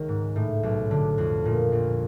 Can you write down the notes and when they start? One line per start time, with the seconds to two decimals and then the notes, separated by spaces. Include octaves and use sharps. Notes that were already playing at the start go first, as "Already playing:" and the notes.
Already playing: C#2 D#3
0.08 G#2
0.36 A2
0.63 B1
0.91 D3
1.18 F2
1.45 A#2
1.72 A#1